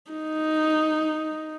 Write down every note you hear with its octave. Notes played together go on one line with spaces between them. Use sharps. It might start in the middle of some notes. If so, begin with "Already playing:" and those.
D#4